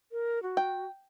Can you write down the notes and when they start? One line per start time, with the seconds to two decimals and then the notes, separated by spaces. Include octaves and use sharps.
0.12 A#4
0.43 F#4
0.57 G5